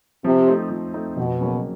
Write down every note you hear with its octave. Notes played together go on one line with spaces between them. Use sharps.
C3 F3
A3 C4 D#4
F3
A3 C4 D#4
F2 B2
C#3 F#3 A#3